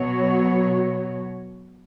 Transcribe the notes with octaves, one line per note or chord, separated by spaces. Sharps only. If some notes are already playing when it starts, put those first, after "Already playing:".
Already playing: B2 F#3 B3 F#4 C#5